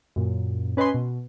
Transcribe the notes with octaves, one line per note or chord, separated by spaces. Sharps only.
F#2 A#2
C#4 B4 D#5 G#5 C6
B2